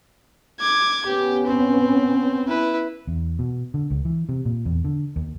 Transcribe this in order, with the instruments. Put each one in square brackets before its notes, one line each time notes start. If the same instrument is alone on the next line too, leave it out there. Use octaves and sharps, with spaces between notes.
[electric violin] D6 G#6
[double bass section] B3 C#4 [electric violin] G4
[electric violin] C4
E4 B4
[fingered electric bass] E2
B2
D3
C#2
E3
C3
A#2
E2
D3
D#2